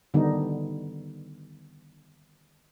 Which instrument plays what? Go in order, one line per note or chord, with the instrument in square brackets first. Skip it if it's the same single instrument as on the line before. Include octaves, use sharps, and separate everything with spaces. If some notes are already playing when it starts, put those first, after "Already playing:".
[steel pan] D3 D#3 G3 B3 D#4